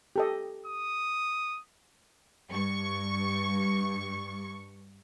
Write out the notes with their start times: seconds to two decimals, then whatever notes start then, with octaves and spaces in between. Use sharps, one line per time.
0.16 G4 A4 D#5
0.66 D#6
2.50 G2 C#6